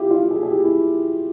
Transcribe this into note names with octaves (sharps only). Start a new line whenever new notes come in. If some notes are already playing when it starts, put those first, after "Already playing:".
Already playing: E4 F4 G4
F4
G#4
G#4
G4
E4